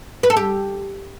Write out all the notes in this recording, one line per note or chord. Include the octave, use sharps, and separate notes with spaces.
B4
A4
G4